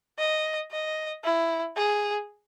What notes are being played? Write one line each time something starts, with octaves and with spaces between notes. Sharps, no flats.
D#5
D#5
E4
G#4